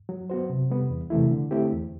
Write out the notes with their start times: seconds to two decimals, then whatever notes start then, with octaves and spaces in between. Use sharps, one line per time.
0.09 F#3
0.30 B3 F#4 C5
0.50 C3
0.70 G3 B3
0.90 E2
1.10 C3 E3 A3 E4
1.31 D3
1.51 A3 C4 E4 G4
1.72 E2